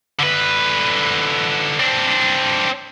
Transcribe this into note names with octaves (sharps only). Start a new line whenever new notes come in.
D3 B4
C4 D4